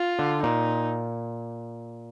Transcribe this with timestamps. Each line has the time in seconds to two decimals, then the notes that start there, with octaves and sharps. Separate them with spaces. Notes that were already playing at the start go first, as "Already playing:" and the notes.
Already playing: F4
0.19 D3
0.43 A#2 D#4